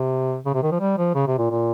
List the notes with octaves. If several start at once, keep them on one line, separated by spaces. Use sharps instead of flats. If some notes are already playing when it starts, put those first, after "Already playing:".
Already playing: C3
C#3
C3
D#3
F3
G3
F3
C#3
C3
A#2
A#2